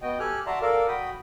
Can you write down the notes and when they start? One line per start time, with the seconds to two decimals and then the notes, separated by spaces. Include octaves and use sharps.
0.02 B3 F#4 D#5 G5
0.19 G4 A4 G#5 F6 F#6
0.46 F#4 D5 E5 A5 A#5 C6
0.62 A4 A#4 D5 F5
0.88 F#4 G5 B5 D#6